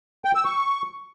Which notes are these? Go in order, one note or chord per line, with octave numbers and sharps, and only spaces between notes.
G5
E6
C#6